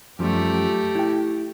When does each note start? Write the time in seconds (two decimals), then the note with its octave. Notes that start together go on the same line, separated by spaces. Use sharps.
0.19 F#2 F3 G3 A3 G4
0.95 E4 G5